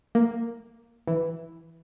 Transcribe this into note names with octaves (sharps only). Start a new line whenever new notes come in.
A#3
E3